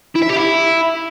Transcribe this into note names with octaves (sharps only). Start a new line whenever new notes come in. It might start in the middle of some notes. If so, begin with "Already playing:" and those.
E4
E5
G4
E4